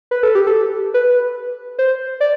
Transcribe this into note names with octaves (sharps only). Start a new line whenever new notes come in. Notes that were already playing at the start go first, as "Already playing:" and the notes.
B4
A4
G4
A4
B4
C5
D5